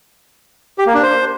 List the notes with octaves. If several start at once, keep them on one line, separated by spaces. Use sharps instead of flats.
G4
A#3
D4
C5